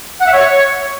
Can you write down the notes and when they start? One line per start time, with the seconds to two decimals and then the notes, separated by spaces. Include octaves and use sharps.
0.21 F#5
0.27 E5
0.33 C#5